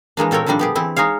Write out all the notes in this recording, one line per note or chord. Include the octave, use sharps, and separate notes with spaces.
E3 G#3 A#3 D4
A#2 C4 A4 A#4 C#5 G5
D3 D#3 F3 G3 D4
B3 G4 G#4
E3 C4 E4
G#3 D#4 G#4 C#5 F5